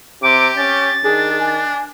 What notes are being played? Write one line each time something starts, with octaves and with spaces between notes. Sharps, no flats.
C3 G4 D6
C#4 A6
D#3 D4 G#4
G#5